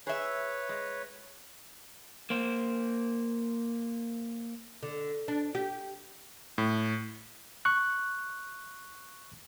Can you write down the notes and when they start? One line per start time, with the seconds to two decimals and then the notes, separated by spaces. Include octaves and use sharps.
0.07 G#4 B4 C#5 E5
0.69 G#3
2.30 A#3 C5
4.83 D3
5.28 D4
5.55 G4
6.58 A2
7.65 C#6 F#6